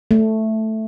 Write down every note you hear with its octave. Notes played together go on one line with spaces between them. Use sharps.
A3